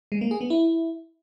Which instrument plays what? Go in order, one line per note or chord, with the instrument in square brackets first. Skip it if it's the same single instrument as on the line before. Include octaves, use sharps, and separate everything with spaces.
[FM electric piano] G#3
A#3
G#4
B3
E4